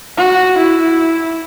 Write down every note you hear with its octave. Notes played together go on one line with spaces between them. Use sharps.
F#4
E4